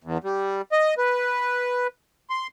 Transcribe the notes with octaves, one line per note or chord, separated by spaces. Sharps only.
E2
G3
D#5
B4
C6